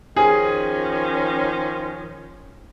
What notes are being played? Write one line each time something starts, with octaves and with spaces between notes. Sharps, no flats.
D#3 F3 C#4 G#4